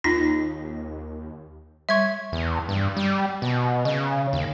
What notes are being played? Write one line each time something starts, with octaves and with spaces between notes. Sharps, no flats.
D#2 D#4 F4 A#6
G3 E5 C#6 G#6
E2
G2
G3
B2
C#3
D#2